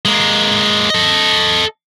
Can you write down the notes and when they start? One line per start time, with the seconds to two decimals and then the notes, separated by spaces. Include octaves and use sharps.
0.05 G#3 A#3
0.90 A4 D#5